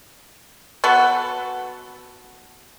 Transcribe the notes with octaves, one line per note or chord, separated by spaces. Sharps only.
B3 F#4 A4